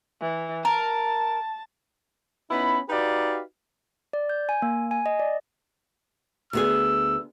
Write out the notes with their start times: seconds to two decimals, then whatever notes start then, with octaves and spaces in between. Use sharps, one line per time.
0.21 E3
0.65 A#4 A5
2.50 B3 C#4 D#4 E4 B5
2.89 D#4 F#4 G4 B4 D5 F5
4.13 D5
4.29 G6
4.49 G#5
4.62 A#3
4.91 G#5
5.06 D#5
5.20 D5
6.53 D2 B3 G#4 E6